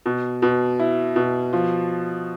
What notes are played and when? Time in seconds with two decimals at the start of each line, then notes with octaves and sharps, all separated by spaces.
0.06 B2
0.42 B2
0.79 E4
1.16 B2
1.53 F3